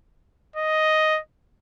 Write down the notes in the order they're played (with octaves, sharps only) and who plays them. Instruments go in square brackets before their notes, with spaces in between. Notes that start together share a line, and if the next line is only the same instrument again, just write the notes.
[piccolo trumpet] D#5